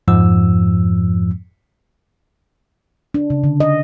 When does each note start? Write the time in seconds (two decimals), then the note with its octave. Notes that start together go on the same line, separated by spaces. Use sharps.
0.08 F2 G#2 F3 E6
3.14 D4
3.30 C#3
3.44 D3
3.60 D#5